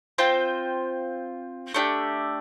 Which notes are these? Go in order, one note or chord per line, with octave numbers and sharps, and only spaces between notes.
C4 F4 C5 G5
A3 D4 G4